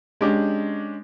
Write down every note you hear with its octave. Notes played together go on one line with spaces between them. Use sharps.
G#3 C#4 D4 G4